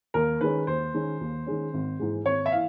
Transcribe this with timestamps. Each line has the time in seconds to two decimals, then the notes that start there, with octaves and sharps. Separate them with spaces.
0.14 D#2 A#4
0.41 D#3 G#3 C#4 B4
0.67 D#2 C5
0.94 D#3 G#3 C#4
1.21 D#2
1.46 D#3 G#3 C#4
1.73 G#1
1.99 G#2 E3 G#3
2.26 G#1 C#5
2.46 E5
2.52 E3 F5